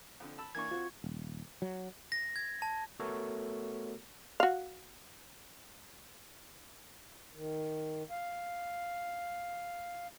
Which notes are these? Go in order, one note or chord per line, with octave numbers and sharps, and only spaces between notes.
F2 D3
A5 B5 E6
E3 A#3 D4 C#6 G#6
C4 F4 F#4
D#1
F#3
A#6
G#6
A5
A3 B3 F#4 A4 A#4 C#5
F#4 F5
D#3
F5